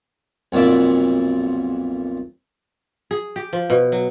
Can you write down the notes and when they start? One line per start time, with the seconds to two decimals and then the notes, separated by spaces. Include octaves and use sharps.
0.52 B1 F2 A#2 D5 E5
3.11 G#4
3.36 G4
3.53 F3
3.70 B2
3.92 F#3